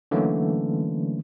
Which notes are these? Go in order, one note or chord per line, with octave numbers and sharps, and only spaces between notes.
D3 E3 F#3 A3 A#3 C#4